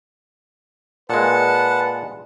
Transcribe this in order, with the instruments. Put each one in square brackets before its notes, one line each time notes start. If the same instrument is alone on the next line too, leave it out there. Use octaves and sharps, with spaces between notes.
[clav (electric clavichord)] A#2 G#3 [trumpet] B4 [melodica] F#5 A5